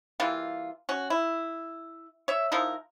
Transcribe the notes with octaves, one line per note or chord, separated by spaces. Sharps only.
E3 G3 A#3 F4
C#4 F#4
E4
C#5 E5
F3 D#4 E4 A#4